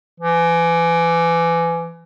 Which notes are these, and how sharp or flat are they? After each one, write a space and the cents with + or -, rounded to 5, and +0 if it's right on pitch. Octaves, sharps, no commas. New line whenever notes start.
E3 +30